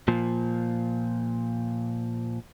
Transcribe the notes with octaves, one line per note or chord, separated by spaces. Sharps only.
A#2 F3